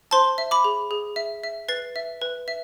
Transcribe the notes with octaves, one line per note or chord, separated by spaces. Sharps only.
C5 A5 C6
E5
B5 D6
G#4
G#4
E5
E5
B4 A6 C7
E5
B4
E5